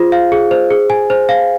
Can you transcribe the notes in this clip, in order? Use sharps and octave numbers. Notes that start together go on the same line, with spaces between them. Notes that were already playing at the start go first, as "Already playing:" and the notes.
Already playing: F4 G#4 C5
F5
G#4
C5
G#4
G#5
C5
F5